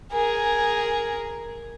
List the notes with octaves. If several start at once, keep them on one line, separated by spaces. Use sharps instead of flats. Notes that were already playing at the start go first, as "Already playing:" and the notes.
G#4 A#4